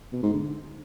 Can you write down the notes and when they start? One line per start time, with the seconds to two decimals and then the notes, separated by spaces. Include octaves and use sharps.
0.13 B2
0.23 G#2
0.34 D3